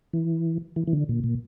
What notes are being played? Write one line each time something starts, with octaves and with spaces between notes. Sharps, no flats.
E3
E3
E3
D3
A#2
A#2